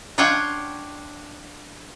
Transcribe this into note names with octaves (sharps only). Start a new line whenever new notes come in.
D4 F4 C#5 F#5 G5